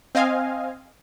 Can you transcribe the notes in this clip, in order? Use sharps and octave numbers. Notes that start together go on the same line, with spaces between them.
C4 D#5 F5 G#5